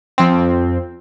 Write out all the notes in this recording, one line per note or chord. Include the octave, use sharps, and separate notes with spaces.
F2 C4